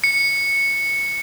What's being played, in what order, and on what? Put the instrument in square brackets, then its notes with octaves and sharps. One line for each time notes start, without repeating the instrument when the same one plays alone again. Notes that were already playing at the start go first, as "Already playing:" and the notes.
[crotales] C#7